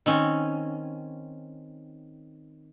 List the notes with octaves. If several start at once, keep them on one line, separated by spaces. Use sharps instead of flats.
D#3 C4 C#4